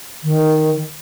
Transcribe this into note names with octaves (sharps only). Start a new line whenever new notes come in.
D#3